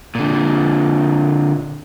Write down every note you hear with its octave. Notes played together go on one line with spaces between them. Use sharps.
A#2 D3